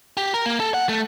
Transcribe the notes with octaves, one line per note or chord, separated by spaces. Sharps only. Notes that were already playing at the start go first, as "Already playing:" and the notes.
G4
A#4
A#3
A4
F#5
A3